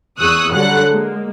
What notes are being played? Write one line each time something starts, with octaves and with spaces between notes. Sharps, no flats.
E2 G#4 C#6 D#6 E6 F#6
D3 F#3 G3 A4 F#5 F#6
G#3 A#3